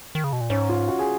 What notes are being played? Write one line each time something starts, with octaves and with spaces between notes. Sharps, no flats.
D#3
C#3
B2
A#2
G#2 C#4
F4
F#4
G#4